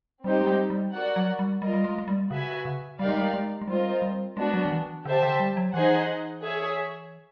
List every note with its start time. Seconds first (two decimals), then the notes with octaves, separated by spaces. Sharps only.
0.24 G3 C4 D#4 G4
0.41 G#3
0.47 G3
0.70 G3
0.94 F#4 A#4 D5 F#5
1.16 F#3
1.39 G3
1.61 G3 F4 A#4 D#5
1.74 G3
1.84 G#3
1.98 G#3
2.08 G3
2.30 C#3 F#4 B4 E5 G#5
2.65 C#3
2.99 G3 D#4 G4 A#4 D5 F5
3.09 G#3
3.18 G3
3.34 G#3
3.62 G#3
3.68 G3 C4 F4 A#4 D#5
4.02 G3
4.37 G#3 B3 D4 F#4
4.53 F#3
4.65 D#3
4.71 E3
5.05 D3 G4 C5 E5 A5
5.23 D3
5.39 G3
5.57 F#3
5.73 E3 D#4 G#4 C5 D#5 F#5
6.42 G#4 C#5 E5